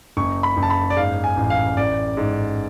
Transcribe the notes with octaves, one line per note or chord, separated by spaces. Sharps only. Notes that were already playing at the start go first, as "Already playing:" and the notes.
F#1 C#6
B5
F#1
A5
B5
D5
G#2 F5
G#5
A1
F5
A1 D5
G#2